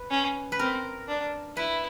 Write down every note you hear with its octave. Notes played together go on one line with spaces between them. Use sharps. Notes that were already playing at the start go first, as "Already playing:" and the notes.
Already playing: B4
C#4
B4
C4 A#4
D4
E4 B4